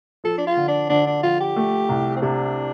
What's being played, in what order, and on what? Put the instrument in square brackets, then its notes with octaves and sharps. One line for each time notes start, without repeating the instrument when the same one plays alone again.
[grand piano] F3 [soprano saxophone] A4
[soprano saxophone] D4
F4
[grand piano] D3
[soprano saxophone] D4
[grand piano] D3 [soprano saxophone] D4
[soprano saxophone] D4
[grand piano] F3 [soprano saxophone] F4
[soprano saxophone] G4
[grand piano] A3
C2
[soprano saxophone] C4
[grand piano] C3 [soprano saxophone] D4